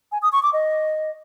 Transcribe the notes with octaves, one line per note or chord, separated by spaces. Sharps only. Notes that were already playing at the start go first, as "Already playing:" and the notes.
G#5
D#6
C#6
D6
D#5